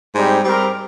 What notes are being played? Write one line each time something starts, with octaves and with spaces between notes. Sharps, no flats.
G#2 G3 C4 D#4 G4
G3 C4 G4 A#4